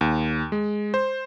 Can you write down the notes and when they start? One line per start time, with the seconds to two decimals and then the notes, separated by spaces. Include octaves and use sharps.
0.01 D#2
0.52 G#3
0.94 C5